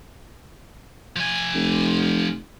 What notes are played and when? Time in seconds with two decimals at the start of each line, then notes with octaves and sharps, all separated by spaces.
1.16 F3 G#5
1.54 F1